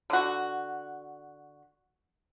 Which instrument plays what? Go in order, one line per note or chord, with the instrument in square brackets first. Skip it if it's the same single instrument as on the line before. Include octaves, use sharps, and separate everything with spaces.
[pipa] D3 F#4